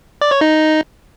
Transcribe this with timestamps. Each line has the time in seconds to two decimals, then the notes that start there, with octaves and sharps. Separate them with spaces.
0.21 D5
0.31 C#5
0.41 D#4